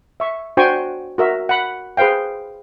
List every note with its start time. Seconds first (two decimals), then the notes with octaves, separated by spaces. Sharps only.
0.20 E5 C#6
0.57 D4 F#4 C5 G5 G#5 C#6
1.18 F#4 A#4 E5
1.49 F#5 B5
1.97 G#4 B4 C5 F5 G5